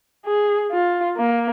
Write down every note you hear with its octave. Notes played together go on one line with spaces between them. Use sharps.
G#4
F4
A#3